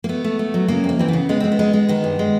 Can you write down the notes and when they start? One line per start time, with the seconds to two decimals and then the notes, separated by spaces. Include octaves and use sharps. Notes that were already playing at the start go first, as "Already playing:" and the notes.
0.04 A#3
0.09 A3 B3
0.24 A3
0.39 A3
0.54 F#3
0.68 C#3 A#3
0.84 F2
0.89 A#3
0.99 E3 C4
1.08 C#3 B3
1.29 G#3 B3
1.40 G#3 C4
1.52 B3
1.59 G#3
1.73 G#3
1.89 D#3 B3
2.04 G2
2.19 G#3